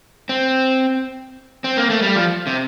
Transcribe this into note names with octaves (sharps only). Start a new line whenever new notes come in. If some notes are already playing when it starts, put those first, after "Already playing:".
C4
C4
A#3
A3
G3
F3
C3